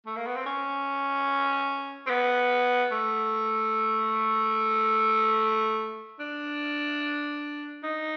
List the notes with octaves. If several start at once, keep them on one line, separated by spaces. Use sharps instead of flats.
A3
A#3
B3
C4
C#4
C4
B3
A3
D4
D#4